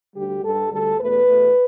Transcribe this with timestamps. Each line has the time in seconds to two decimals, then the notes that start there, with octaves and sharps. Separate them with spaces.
0.14 D2 D3 G3 G4
0.42 G2 G3 A4
0.70 D2 D3 G3 A4
0.98 E2 B2 A3 B4
1.27 E2 B2 A3